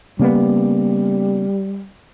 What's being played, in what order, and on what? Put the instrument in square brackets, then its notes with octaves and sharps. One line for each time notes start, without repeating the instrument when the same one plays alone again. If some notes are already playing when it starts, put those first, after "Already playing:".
[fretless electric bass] C#3 A#3 B3 [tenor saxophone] G3